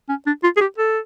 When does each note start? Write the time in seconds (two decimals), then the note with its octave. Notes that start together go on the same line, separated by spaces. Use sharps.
0.09 C#4
0.27 D4
0.44 F4
0.57 G#4
0.61 G4
0.78 A4